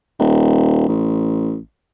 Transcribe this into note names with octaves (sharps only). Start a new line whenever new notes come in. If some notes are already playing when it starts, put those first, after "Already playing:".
D#1
A1